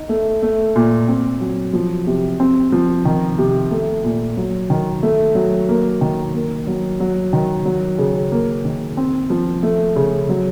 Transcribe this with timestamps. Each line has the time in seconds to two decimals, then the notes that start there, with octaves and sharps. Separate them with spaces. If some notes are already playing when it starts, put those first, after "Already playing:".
Already playing: D#4
0.09 A3
0.42 A3
0.76 A#2
1.08 C4
1.40 F#3
1.73 F3
2.07 C3
2.40 C4
2.72 F3
3.05 D#3
3.38 C3
3.71 A3
4.04 A#2
4.37 F#3
4.70 D#3
5.03 A3
5.35 F#3
5.69 A#3
6.01 D#3
6.34 A#3
6.67 F#3
7.00 F#3
7.33 D#3
7.65 F#3
7.98 C#3
8.32 A#3
8.65 D#3
8.97 C4
9.30 F3
9.63 A3
9.96 C#3
10.29 F#3